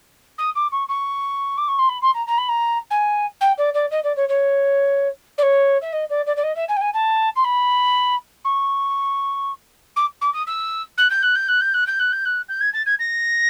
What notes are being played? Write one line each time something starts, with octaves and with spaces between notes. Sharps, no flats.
D#6
D6
C#6
C#6
D6
C#6
C6
B5
C6
A#5
A#5
B5
A#5
G#5
G5
D5
D5
D#5
D5
C#5
C#5
D5
C#5
E5
D#5
D5
D5
D5
D#5
E5
G#5
G5
G#5
A5
C6
B5
C#6
D6
D6
D#6
E6
F#6
G6
F#6
G6
F#6
G6
F#6
G6
F#6
G6
F#6
G6
G#6
A6
G#6
A#6